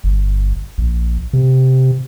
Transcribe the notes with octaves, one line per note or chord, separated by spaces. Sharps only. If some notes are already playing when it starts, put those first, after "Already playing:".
G1
A#1
C3